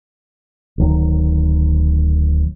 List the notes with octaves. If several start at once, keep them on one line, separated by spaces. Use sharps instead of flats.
D1 D#3 F#3